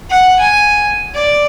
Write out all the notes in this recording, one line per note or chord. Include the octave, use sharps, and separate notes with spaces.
F#5
G#5
D5